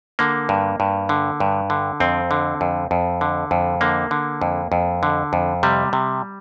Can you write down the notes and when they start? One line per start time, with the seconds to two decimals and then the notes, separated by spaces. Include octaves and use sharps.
0.19 D3 A#3
0.49 G2
0.80 G2
1.09 D3
1.40 G2
1.70 D3
2.00 F2 C4
2.31 D3
2.61 F2
2.91 F2
3.21 D3
3.51 F2
3.81 D3 A#3
4.11 D3
4.42 F2
4.72 F2
5.03 D3
5.33 F2
5.63 C3 G3
5.93 C3